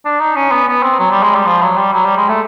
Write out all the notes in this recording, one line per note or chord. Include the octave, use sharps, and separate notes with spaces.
D4
D#4
C#4
B3
B3
C4
F#3
G3
G#3
G3
F3
F#3
G3
F#3
G3
G#3
A3